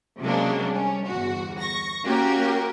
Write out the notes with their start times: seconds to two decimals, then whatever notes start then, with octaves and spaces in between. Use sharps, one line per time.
0.21 C3 F#3 G#3 A#3 C#4 D4
0.69 G3 C#4
1.07 G1 E2 F#4
1.61 C#6 A#6
2.04 A#3 C#4 F#4 G4 A#4